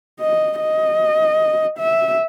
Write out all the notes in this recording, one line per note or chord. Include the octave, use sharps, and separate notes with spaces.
D#5
D#5
E5